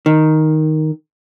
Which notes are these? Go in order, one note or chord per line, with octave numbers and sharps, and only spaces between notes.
D#3